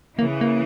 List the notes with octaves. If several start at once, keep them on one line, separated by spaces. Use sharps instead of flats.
C#3 E3 A#3
A#3